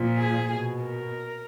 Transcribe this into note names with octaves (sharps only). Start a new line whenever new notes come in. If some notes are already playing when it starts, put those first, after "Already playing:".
Already playing: A#2 F3
G#4
B2
A#4